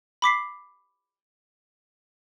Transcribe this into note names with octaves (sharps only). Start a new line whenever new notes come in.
B5 D6 B6 C7